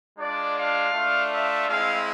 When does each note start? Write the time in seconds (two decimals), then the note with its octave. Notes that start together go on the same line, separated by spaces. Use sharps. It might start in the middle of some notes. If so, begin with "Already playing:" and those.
0.18 G#3 D4 F4 D5
0.56 F5
0.94 A3 D4 F4
1.31 E5
1.68 G#3 C4 E4 F5